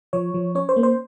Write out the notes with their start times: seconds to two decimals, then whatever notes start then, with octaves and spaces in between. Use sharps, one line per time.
0.13 F3 C#5
0.34 F3
0.55 C#4 C#5
0.69 C5
0.76 A#3
0.83 C5